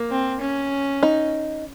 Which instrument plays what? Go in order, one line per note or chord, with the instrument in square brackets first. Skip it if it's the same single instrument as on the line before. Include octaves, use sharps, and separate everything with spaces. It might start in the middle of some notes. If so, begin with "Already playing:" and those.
Already playing: [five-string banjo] A#3
[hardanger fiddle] C4
C#4
[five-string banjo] D#4